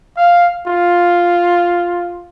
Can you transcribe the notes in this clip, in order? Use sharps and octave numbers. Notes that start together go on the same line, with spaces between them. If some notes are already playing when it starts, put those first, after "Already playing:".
F5
F4